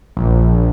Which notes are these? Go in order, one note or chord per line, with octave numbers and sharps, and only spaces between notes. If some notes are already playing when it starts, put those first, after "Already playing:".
A#1